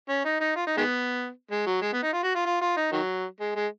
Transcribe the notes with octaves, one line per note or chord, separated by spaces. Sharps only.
C#4
D#4
D#4
F4
D#4
D#3 G#3 B3
G#3
F#3
G#3
B3
D#4
F4
F#4
F4
F4
F4
D#4
D#3 F#3
G#3
G#3